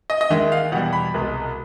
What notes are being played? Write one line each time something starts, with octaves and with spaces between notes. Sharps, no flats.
D#5
D#5
D#2 D#3 G#3 E5
F5
E2 B2 G3 F#5
B5
C2 B2 G#3